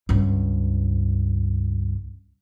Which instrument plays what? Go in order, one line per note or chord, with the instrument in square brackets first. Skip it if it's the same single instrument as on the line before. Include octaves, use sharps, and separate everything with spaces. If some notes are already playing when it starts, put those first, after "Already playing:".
[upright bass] C#2 G2